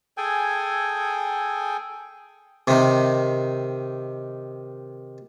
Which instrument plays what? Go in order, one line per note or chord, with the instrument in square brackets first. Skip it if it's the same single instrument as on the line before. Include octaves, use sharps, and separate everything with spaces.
[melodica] G#4 A4 G5 G#5
[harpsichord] C3 D#3